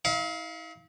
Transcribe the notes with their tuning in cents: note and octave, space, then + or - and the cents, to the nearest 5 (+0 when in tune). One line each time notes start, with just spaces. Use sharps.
E4 -45 F5 +0